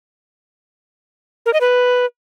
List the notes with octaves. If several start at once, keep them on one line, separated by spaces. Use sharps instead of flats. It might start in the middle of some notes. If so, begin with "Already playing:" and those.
A#4
D#5
B4